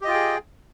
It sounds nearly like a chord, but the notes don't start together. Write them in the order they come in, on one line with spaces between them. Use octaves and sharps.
G4 D#5 F4 G5 G#4